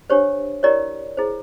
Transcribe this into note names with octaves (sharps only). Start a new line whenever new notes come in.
D4 G4 C5 C#5
E4 G4 A#4 C#5 D5
E4 G#4 C5